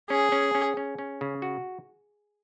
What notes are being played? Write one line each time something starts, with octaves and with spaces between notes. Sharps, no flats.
C#4 G#4
C#4
C#4
C#4
C#4
C#3
F#4